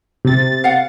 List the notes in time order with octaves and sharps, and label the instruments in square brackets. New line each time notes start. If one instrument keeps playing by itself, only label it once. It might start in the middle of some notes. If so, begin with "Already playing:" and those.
[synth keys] C3 A6
[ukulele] F5 F#5